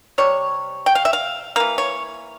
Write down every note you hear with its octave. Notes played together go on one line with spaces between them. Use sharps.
C3 G3 C#5
G5
F5
E5
F5
E3 A#3 F5
C#5